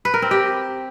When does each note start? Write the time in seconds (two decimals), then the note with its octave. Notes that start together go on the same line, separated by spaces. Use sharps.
0.05 B4
0.14 A#4
0.22 C4
0.31 G4